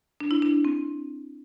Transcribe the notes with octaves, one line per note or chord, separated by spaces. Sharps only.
D4
E4
D4
C4